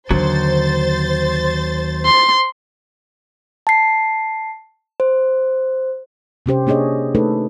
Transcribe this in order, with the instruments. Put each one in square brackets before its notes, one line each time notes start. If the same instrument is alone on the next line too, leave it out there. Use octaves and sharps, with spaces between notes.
[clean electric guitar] D#2 F#3 [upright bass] D3 [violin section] C5 A6
[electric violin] C6
[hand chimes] A5 C7
C5
[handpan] C3 C#4 G4 C5
A#3 D4 G#4 C#5 D#5
A3 D#4 A4 B4